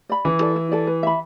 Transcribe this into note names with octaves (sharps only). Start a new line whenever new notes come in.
D5 B5
E3 E4
A4 D5
E4
A4 D5
B4
E5 B5